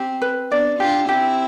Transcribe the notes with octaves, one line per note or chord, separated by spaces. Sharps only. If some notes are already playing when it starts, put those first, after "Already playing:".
Already playing: C4 G4
B4
B3 D4 D5
D4 F4 G4
C4 E4 G4